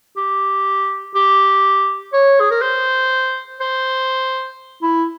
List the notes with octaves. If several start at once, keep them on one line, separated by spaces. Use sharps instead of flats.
G4
G4
C#5
G#4
A#4
C5
C5
E4